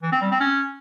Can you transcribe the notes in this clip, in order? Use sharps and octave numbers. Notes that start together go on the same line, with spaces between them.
E3
C4
G3
C4
C#4